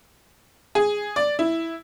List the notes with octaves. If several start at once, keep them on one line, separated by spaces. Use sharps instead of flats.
G#4
D5
E4